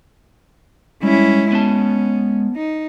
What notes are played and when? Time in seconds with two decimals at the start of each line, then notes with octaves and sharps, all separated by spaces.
1.03 G3 G#3 C#4 E4
1.52 B3 C#4 A5
2.56 D#4